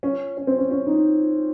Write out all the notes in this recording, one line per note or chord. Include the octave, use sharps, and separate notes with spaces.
C#4
C#4
C4
C#4
C#4
D#4